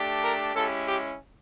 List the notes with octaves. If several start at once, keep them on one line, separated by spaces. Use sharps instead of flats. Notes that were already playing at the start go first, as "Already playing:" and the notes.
Already playing: A3 D4 G4
A#4
G#3 C#4 E4 G4 A4
G4